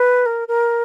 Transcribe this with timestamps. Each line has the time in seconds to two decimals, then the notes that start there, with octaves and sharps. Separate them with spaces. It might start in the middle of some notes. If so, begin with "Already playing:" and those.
Already playing: B4
0.25 A#4
0.48 A#4